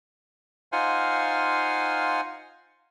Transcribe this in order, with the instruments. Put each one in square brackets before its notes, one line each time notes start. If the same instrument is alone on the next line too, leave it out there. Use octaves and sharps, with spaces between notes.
[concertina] D#4 F4 C5 F5 F#5 G#5